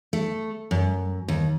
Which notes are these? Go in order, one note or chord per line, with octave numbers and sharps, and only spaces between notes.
A3
F#2
D#2